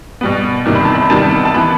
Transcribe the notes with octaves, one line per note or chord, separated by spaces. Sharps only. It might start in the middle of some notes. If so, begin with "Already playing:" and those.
B2 G3 B3
E2 C3 D#3 G3
B5
A5
B5
C3 D#3 G3 B3 A5
A5
E3 B3 B5